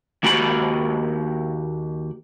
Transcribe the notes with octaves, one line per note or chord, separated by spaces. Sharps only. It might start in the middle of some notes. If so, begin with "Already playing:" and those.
D#2 A#3 F#4 G4 G5 B5